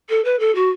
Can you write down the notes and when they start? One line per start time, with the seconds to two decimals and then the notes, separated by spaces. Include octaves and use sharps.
0.09 A4
0.24 B4
0.39 A4
0.55 F#4